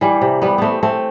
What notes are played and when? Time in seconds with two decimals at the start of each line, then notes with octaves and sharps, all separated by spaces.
0.01 E3 G3
0.21 C3
0.42 G3 B3
0.58 A3 B3 C4
0.83 A3 C4